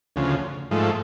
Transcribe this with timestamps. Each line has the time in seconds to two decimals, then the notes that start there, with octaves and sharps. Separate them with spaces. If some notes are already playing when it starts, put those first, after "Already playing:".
0.16 D2 C#3 F3
0.71 G#2 F3 A3